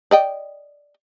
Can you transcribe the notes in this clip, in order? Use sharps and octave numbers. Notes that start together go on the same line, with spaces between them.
D5 D#5 G5